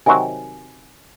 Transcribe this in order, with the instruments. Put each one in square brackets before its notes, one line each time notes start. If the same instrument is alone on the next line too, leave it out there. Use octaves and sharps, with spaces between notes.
[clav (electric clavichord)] C3 D#3 F#3 C4 F#4 [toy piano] G#5